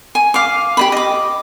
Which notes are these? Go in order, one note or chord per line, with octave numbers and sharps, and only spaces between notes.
G#5
F5 D6
G4 D#5 B5
D#5 D6